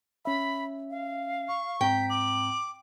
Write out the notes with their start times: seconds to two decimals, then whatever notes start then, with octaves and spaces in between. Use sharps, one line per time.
0.25 C#4 E5 B5
0.90 F5
1.48 C#6
1.81 G#2 C4 G5 A#5 B6
2.10 D6 F#7